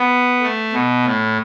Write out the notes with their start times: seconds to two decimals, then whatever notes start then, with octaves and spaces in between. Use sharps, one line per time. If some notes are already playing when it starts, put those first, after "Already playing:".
Already playing: B3
0.42 A3
0.73 B2
1.05 A2